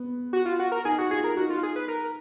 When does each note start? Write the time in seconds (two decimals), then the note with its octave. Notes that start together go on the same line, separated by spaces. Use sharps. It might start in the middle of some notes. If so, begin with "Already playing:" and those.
Already playing: B3
0.33 F#4
0.46 F4
0.59 F#4
0.72 A#4
0.85 D#4 G#4
0.98 F#4
1.11 F4 G#4
1.24 A#4
1.37 D#4 F#4
1.50 F4
1.63 G#4
1.76 B4
1.88 A#4